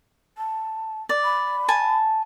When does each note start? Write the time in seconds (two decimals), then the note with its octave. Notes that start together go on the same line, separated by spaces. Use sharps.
0.38 A5
1.09 D5
1.24 B5
1.68 G#5 A5